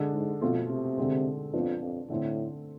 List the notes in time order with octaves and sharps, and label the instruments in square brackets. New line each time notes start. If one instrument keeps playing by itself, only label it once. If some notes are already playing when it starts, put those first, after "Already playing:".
Already playing: [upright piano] D3 G#3 D4
[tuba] G#2
[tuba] F2 [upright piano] B2 A3 C4 F4
[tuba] C3
[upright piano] D3 G#3 C4
[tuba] F2 [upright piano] F3 B3 D4
[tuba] F2
[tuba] A2 [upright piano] D3 A3 C4